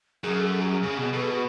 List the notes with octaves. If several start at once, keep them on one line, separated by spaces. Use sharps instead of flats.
F#2 G#4
A4
G#4
F#4
G#4
C#3
B2
B2 A4
G#4
F#4